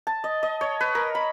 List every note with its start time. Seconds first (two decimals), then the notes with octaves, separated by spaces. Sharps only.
0.07 A5
0.24 D#5
0.43 D#5
0.61 C#5
0.81 B4
0.95 A#4
1.15 B5